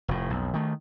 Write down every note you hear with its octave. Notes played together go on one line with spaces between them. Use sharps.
F1 A2
B1 F2
D#3 A3